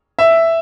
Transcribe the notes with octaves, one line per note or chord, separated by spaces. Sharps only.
E5